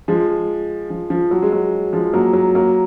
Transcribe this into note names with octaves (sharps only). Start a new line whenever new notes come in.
F3 G#3
F3
F3
F#3
G#3
F#3
F3 G#3
F#3 A#3
F#3
F#3 A#3